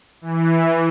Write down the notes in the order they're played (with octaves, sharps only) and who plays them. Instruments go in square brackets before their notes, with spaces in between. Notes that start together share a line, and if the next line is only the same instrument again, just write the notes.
[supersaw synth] E3